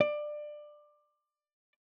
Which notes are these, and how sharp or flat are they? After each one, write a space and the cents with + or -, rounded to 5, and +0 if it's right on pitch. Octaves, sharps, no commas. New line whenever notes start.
D5 +20